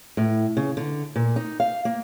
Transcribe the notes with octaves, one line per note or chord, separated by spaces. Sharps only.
A2
C#3
D3
A#2
D#4
F5
A#3